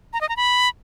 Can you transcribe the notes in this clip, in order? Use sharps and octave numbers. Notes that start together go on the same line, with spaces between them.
A#5
D#5
A#5
B5